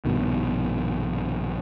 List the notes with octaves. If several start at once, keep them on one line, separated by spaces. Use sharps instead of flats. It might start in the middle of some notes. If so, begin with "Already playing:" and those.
A#1 G2 B2 D#3